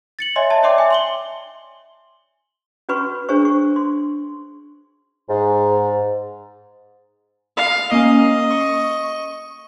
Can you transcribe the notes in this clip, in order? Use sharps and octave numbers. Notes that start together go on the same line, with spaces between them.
A6 C#7 F#7
C#5 D#5 E5 G#5 C6
D#5 E5 A5
C#5 D5 E5 G5 C6 D6
E5 G#5
C6 F#7 G7
C#4 F#4 B4 B5 C#6
D4 G#4 C5 C#6
G#4 C#6
C6
G#2
F5
A#3 C#4 D#5
C#6